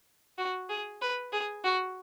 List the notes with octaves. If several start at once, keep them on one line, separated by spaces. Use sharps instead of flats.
F#4
G#4
B4
G#4
F#4